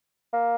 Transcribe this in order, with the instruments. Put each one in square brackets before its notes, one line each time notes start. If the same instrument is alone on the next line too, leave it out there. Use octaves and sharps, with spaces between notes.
[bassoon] A#3